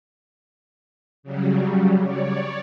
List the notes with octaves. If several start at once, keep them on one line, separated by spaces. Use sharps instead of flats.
C#3 F#3 G3
C#5 D5